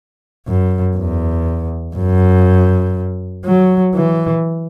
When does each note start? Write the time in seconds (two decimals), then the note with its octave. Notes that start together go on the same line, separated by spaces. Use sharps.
0.47 F#2
0.96 E2
1.96 F#2
3.45 F#3
3.95 E3